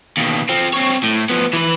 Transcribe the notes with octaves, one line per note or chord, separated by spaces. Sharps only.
D#2 B2
F3 C4
C4 C#5
A2
F3 B3
E3 B4